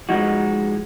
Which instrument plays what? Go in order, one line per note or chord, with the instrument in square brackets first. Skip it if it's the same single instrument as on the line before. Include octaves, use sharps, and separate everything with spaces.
[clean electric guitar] F3 G#3 D#4 F#4